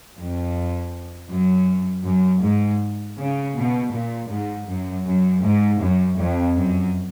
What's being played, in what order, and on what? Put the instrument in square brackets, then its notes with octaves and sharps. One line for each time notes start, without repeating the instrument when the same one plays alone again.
[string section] F2
F#2
F#2
G#2
C#3
B2
A#2
G#2
F#2
F#2
G#2
F#2
F2
F#2